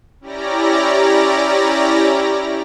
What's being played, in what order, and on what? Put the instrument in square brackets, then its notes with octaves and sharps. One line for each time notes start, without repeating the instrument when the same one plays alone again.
[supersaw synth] C#4 E4 G4 D5 A#5 A#6